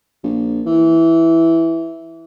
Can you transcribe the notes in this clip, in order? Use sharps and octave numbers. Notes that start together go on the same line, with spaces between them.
A#1
E3